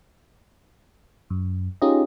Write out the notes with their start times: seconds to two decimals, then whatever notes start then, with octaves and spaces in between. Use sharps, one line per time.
1.30 F#2
1.82 C#4 D#4 F4 G4 G#4 D#5